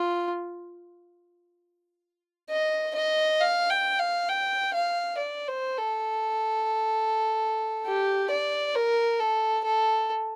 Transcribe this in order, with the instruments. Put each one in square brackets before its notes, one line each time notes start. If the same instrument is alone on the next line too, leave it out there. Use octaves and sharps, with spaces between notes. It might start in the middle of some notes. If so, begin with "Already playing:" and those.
Already playing: [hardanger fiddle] F4
D#5
D#5
F5
G5
F5
G5
F5
D5
C5
A4
G4
D5
A#4
A4
A4